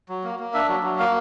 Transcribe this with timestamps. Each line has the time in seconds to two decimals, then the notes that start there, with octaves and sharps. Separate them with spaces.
0.09 F#3
0.24 A#3
0.39 A#3
0.54 D4 E5
0.68 F#3
0.83 F#3
0.99 A#3 F5